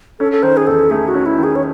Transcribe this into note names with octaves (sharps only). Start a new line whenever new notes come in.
C#4 A4
A4
D#3 C5
G#4
E2 A4
A3 G#4
F#4
C#4
E4
D#3
G#4
C#5